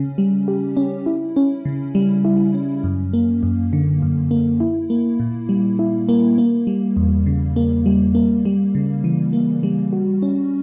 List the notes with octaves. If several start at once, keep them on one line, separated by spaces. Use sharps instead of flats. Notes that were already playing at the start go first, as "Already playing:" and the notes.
Already playing: C#3 C#4
G3
G4
C#4
E4
C#4
C#3
G3
E4
C#4
F#2
A#3
F#2
D3
F#2
A#3
E4
A#3
A#2
G3
E4
A#3
A#3
G3
E2
C#3
A#3
G3
A#3
G3
C#3
E3
A#3
G3
F#4
C#4